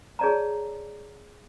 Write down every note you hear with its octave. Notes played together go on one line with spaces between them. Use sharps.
G#4 C#5 D5 A5 A#5